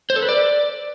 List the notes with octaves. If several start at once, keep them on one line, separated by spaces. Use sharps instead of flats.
C5
A4
B4
D5